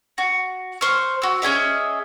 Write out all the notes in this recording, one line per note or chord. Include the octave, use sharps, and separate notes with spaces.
F#4
C5 C#6 F6
F#4 E6
C#4 G#4 D#5 E5